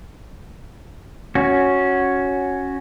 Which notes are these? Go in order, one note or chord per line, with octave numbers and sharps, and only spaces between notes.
C#4 F#4